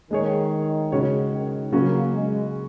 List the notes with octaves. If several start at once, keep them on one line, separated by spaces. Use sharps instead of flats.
D#3 G#3 D#4 G#4 C#5
C#3 G#3 F#4 C#5
D#3
C#3 F#3 A#3 C#4 F#4
G#3